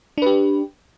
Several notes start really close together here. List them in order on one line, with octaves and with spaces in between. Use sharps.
D4 B4 G4